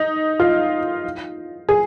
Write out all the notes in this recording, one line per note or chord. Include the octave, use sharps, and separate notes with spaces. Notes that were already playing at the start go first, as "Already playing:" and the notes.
Already playing: D#4
F4
G#4